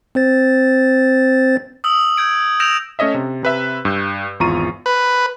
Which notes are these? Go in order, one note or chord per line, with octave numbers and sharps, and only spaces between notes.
C4 C5 A6
D#6 E6 F#7
G6 G#6 D7
E6 G6 A#6 D7 E7 F7
A3 C#4 C#5 D#5 E5
C3
C3 B4 E5
G2 E6 G6
G#1 E2 F4 A#5 C#6 D#7
B4